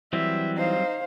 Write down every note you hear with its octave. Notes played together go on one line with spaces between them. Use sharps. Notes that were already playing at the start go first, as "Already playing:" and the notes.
E3 F#3 G3 C4 E5
D#4 C5 F5